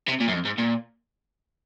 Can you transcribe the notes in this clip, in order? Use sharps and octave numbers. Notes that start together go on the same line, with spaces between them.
C3
A#2
F#2
F2
G#2
A#2